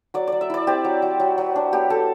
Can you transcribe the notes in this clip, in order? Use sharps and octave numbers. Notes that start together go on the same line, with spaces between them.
F#3 D5
F#3 D5
E5
E4 D5
C4 G4
F#3
F#3
F#3
F#3
D4
B3 G4
F#3 A4